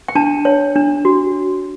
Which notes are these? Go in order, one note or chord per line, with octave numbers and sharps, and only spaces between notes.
G5
D4 A5
C#5
D4
F#4